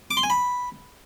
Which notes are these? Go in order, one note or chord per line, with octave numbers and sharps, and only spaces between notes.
D6
C6
G#5
B5